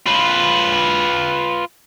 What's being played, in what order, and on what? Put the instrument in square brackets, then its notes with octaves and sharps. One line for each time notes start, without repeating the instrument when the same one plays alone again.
[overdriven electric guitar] F4 B4